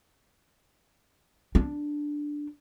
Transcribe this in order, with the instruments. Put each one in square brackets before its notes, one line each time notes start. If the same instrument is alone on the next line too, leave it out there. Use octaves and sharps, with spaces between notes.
[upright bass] D4